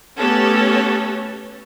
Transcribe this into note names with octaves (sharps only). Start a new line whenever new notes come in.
A3 B3 C#4 G4 A4 C#5